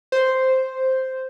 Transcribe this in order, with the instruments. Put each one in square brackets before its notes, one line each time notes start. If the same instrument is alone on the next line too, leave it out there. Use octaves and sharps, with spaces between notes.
[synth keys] C5